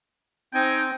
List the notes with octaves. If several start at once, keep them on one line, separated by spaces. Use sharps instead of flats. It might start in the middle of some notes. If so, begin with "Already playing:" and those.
C4 D#4 G5 G#5